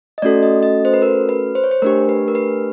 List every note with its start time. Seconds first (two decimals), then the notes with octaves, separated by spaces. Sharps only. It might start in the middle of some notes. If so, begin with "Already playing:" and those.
0.18 D#5
0.22 A3 C#4 F#4 A4 D5
0.43 D#5
0.63 D#5
0.85 C5
0.94 B4
1.02 A#4
1.29 B4
1.55 C5
1.64 C#5
1.71 C5
1.82 A3 D4 G4 A#4
2.09 B4
2.28 A#4
2.35 B4